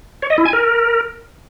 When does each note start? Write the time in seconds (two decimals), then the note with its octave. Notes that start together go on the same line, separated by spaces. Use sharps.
0.22 C#5
0.30 D#5
0.38 E4
0.45 G#5
0.53 A#4